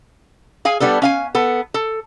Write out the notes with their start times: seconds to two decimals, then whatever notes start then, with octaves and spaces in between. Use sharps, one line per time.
0.65 G#4 F5 G#5
0.80 G3 B3 D4 A4
1.02 C#4 F5 G#5
1.35 B3 A4
1.74 A4